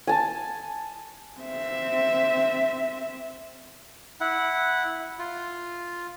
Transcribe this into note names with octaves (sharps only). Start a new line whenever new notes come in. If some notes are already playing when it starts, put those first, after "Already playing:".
G#5 A5
C4 E5
E4 F#5
F4